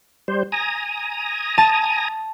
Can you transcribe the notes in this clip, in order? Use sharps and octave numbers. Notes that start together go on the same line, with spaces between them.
G3 C5
G#5 A#5 D#6
A5